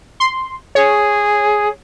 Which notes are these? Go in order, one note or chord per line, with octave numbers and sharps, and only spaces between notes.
C6
G#4 C#5